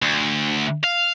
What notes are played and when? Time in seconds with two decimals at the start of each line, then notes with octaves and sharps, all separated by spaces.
0.02 D2
0.84 F5